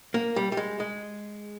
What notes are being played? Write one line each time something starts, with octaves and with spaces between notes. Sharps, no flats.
A#3
G3
G3
G#3
G#3